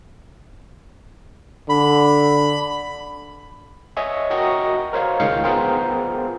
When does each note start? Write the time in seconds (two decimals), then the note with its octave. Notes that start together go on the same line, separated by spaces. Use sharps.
1.69 D3 B5
3.97 C#5 D#5 E5 G#5 C#6
4.30 F#4 A#4 D#5 G5 C#6
4.93 A#4 C5 C#5 F5
5.20 C#2 D#3 G#3 F5 G6 C#7
5.44 B3 F4 G#4 A#4 C5 G5